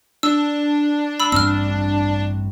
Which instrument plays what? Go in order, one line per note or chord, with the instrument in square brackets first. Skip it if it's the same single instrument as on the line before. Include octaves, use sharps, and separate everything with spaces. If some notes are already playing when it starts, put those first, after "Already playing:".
[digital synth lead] D4 [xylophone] E6
[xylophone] B5 E6
[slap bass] A1 G2 C4 [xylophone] E6 F6